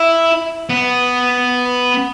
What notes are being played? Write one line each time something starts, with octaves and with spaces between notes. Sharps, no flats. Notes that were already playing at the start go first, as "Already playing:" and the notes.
Already playing: E4
B3